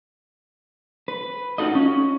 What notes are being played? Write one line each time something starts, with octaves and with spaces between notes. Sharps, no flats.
B4
D#4 F4 F#4 A4 D#5
C#4